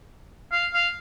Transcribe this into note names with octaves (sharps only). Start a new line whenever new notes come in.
F5
F5